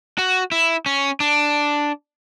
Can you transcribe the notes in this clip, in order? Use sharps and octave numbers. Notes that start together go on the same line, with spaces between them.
F#4
E4
C#4
D4